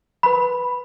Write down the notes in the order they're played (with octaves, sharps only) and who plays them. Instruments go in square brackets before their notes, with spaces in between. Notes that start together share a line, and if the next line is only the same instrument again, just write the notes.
[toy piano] B4 B5